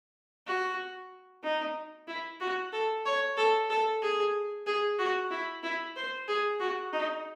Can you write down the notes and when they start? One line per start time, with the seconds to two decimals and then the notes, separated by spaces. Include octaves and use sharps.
0.47 F#4
1.43 D#4
2.08 E4
2.40 F#4
2.73 A4
3.06 C#5
3.37 A4
3.70 A4
4.02 G#4
4.66 G#4
4.98 F#4
5.31 E4
5.63 E4
5.96 C5
6.28 G#4
6.60 F#4
6.93 D#4